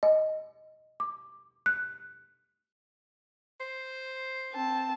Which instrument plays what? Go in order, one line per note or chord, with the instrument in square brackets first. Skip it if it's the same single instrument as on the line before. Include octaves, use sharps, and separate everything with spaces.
[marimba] D#5
D6
F#6
[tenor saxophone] C5
[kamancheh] C4 A5